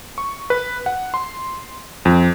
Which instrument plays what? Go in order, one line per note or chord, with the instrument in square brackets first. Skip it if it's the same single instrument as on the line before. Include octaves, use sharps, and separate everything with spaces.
[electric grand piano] C#6
B4
F#5
C6
F2